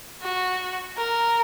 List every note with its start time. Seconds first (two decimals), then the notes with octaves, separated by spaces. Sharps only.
0.22 F#4
0.97 A#4